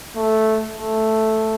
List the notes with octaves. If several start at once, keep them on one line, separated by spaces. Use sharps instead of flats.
A3
A3